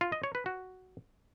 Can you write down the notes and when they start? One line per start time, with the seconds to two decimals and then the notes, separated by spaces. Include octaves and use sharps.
0.01 F4
0.12 D#5
0.23 C#5
0.35 B4
0.46 F#4